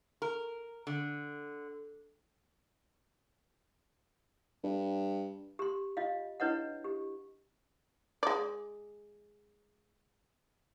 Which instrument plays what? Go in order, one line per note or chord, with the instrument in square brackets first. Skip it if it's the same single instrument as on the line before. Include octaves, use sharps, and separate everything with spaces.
[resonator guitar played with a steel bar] A#4
D3
[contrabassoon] G2
[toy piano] G4 C6
F4 D#5 F5
D4 E4 B4 C#5 D#5 F#5
G4
[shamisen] G#3 D5